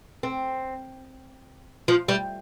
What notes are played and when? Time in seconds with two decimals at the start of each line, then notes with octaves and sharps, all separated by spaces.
0.23 C4
1.88 F3
2.08 G3